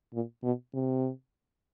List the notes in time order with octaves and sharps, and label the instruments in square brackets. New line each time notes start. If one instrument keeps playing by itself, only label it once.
[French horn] A#2
B2
C3